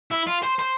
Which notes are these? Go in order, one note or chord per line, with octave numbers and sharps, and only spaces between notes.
E4
F4
C5
C5